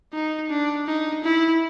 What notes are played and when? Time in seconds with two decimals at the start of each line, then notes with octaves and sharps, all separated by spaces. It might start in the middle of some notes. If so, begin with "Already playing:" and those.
0.13 D#4
0.50 D4
0.87 D#4
1.24 E4